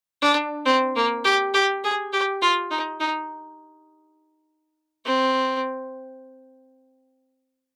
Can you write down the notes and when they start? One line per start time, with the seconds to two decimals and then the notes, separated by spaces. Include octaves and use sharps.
0.22 D4
0.66 C4
0.96 A#3
1.25 G4
1.54 G4
1.84 G#4
2.12 G4
2.42 F4
2.71 D#4
3.00 D#4
5.06 C4